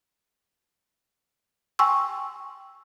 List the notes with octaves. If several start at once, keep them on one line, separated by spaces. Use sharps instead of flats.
G5 G#5 C6 C#6 E6